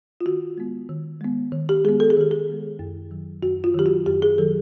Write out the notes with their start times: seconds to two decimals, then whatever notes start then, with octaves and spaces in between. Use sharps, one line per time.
0.21 F4
0.26 D#3 F#4
0.58 G#3 B3
0.89 D#3
1.21 G#3 B3
1.52 D#3
1.69 G4
1.85 G#3 B3 G#4
2.00 A4
2.10 G#4
2.17 D#3 G4
2.31 G#4
2.48 G#3 B3
2.79 F#2
3.11 D#3 F#3
3.43 F#2 F#4
3.64 F4
3.74 D#3 F#3 G4
3.86 F#4
4.06 F#2 G4
4.22 G#4
4.38 D#3 F#3 A4